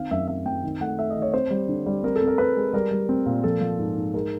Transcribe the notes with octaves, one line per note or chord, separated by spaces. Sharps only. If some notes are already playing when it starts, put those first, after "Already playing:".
Already playing: D#3 C4 F5
F#2 E5
C4 E5
C4 G5
D#3
A3 F#5
A3 E5
D#5
D#3
C#5
C4 C5
G3
D3
G3
C4 A#4
A4
C4
A#4
C4 B4
G#3
G3 A#4
G3
C4
A#2
F3 A4
F3
G#2
G#2
G#3 A#4